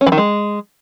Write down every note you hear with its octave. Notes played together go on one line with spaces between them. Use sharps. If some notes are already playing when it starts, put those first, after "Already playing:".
C#4
E3
D#3
G#3